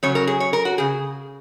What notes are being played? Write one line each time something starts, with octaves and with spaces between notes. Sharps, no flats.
C#3 F#3 C#4 C#5
A#4
G#4
C#5
A#4
F#4
C#3 G#4